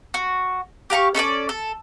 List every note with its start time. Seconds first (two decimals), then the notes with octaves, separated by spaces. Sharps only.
0.14 F#4
0.90 G4 F5 A#5 C#6
1.15 C#4 A4 C#5 D5
1.49 A4